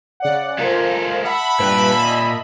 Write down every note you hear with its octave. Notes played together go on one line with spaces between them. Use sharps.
C#3 D5 F#5
G#3 F4 A4 A#4 C5
E5 F#5 A5 B5
G2 A#2 B4 G5
D#5